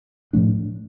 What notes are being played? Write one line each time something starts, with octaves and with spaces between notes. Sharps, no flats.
A2 F3 A3 D4